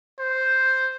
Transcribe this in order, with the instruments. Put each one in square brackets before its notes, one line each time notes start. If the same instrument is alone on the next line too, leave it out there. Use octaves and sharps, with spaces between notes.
[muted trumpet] C5